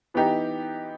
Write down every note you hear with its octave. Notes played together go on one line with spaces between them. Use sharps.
E3 B3 D#4 G4